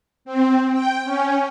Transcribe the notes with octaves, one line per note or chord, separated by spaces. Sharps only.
C4
G5
C#4